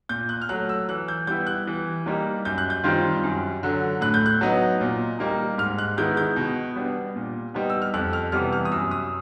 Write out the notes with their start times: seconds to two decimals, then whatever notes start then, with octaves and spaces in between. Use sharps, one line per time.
0.09 A#2 G6
0.29 F#6
0.42 F6
0.49 F#3 A3 F#6
0.69 E6
0.89 E3 F#6
1.08 G6
1.27 G3 B3 E4 G6
1.47 F#6
1.67 E3
2.06 G3 A#3 D#4
2.45 F#2 G6
2.58 F#6
2.70 G6
2.84 D#3 G3 C4 F4
3.23 F#2
3.63 D3 F#3
4.01 A2 F#6
4.14 G6
4.26 F#6
4.41 F#3 B3 D#4
4.81 A#2
5.19 G3 A#3 D#4
5.58 G#2 F6
5.79 F#6
5.97 D#3 G#3 B3 E4 G6
6.17 G6
6.36 B2
6.76 G3 B3 D4
7.16 A#2
7.54 G3 B3 D#4
7.70 E6
7.82 F6
7.94 F2 F#6
8.13 F6
8.32 C3 E3 G3 B3 F6
8.53 F6
8.65 D#6
8.72 F#2 E6
8.91 D#6